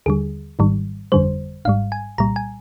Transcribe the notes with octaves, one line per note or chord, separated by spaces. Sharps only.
D#2 D3 G3 G#4
G#1 G#2 D#3 G3
G1 F2 D3 G3 C5
G#1 G#2 G3 F5
G#5
C2 A#2 G3 A#5
G#5